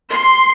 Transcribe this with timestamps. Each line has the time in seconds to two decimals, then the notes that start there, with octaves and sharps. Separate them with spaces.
0.12 C6